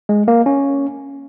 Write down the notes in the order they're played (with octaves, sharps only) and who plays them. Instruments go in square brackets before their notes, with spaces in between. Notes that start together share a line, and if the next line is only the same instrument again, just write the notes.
[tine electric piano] G#3
A#3
C#4